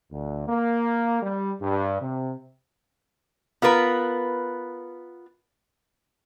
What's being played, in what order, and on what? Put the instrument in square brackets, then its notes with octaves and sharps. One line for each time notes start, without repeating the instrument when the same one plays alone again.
[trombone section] D2
A#3
G3
G2
C3
[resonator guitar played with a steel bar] B3 F4 A#4 B4